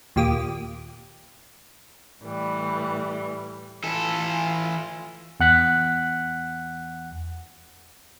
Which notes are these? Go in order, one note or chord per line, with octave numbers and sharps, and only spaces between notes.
D#2 A#2 G4 D6 D#6
A2 E3 G3
E3 F4 A4
E2 F#5 F#6 B6